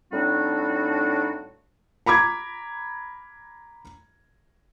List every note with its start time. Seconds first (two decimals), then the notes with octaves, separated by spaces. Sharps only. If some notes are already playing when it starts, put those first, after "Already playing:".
0.12 A2 G3 C4 D4 D#4 F#4
2.06 A#5 B5 D6 G#6